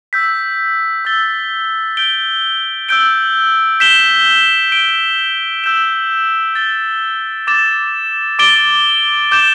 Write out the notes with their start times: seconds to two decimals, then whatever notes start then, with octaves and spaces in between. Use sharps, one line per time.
0.13 E6 G6 B6
1.05 E6 A6 G7
1.97 G6 D7 G7
2.89 E6 G6 D7 G7
3.80 G6 B6 E7 G7
4.72 G6 D7 G7
5.64 E6 G6 E7
6.55 A6 G7
7.47 D6 A6 E7
8.39 D6 A6 D7 G7
9.31 D6 G6 E7